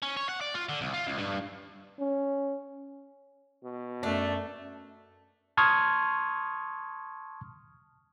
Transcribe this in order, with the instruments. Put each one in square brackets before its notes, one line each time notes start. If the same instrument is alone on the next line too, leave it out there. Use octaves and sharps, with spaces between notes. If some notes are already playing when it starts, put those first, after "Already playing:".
[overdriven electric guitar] C#4
C#5
F#5
D5
F4
D3
C2
F4
C#2
G2
[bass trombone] C#4
B2
[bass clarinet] F#2 [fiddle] A3 [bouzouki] D4
[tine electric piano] A5 C6 C#6 D#6 F6 G#6